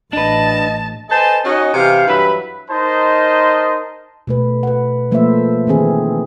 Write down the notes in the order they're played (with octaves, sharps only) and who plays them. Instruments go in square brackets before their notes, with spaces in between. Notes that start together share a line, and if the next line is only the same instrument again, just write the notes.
[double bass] A1 [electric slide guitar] D4 B4 [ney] D#5 [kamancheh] A5
[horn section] A4 B4 C5 D#5 G#5 A5
C#4 D#4 F#4 D#5
C3 E3 C5 F5
G2 E3 F#3 B4 E5 B5
[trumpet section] D#4 A#4 C5 D#5 A5 C6
[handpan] B2 A3 B4
B4 F#5
F3 A3 A#3 B4 C5 E5
D#3 E3 C4 G#4